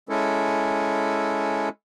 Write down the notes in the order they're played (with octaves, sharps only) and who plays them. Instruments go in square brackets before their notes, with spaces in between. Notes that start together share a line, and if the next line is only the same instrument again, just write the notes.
[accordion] G#3 C#4 E4 A4